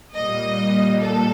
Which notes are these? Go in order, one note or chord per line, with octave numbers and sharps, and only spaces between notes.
A#2 G3 A#3 D#5
A4